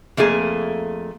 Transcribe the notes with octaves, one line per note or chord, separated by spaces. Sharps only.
F2 A3 A#3 G#4